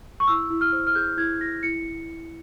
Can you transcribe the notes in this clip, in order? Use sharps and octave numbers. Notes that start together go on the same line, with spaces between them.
C#6
E4 E6
E4
F6
C5
F6
G#4 G6
E4 G#6
E4 A#6
E4 C#7